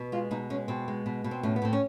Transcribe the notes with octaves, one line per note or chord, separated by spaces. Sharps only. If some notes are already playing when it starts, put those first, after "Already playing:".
Already playing: B2
G#3 F4
B2 D#4
G#3 C#4
B2 C4
G#3
B2
B2
C4
A2 C#4
B3
A2 C4
C#4